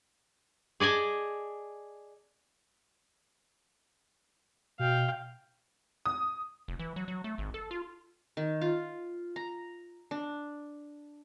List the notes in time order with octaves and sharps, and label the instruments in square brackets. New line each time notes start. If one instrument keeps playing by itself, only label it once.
[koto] G#4 D5 D#5 G#5 A5
[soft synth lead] B2 [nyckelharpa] F5 G5
[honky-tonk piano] D#6
[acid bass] F1
E3
F#3
F#3
A3
G#1
A4
F4
[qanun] D#3
F4
A#5
D4